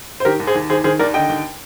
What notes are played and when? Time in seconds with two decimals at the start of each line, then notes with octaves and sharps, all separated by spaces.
0.20 C5
0.25 D#3 G4 A#4
0.40 D#2
0.47 G#4 C5
0.55 D#2
0.70 D#3 G#4 C5
0.84 D#3 G#4 C5
0.99 D#2 A#4 D5
1.14 D3 D#5 G5
1.29 D#2